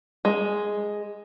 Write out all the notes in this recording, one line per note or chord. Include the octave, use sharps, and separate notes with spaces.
G#3